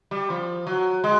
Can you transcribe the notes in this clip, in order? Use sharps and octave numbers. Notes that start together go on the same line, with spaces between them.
G3
F3
F#3
G#3